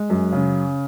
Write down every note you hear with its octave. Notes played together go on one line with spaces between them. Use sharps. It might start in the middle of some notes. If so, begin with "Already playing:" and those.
Already playing: G#3
F#2
C#3